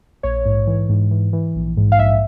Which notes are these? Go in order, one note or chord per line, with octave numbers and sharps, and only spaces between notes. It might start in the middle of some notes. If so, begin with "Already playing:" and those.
A#1 C#5
G#2
E3
G#2
E3
E3
A#1
G#2
F5
A#1 E5